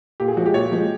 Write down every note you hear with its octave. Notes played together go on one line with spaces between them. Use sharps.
A#2 G4
G#4
F3 G#3 F#4
G4
A#2 C#5
F3 G#3